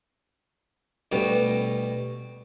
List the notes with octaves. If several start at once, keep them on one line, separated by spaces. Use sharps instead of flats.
D2 B2 G3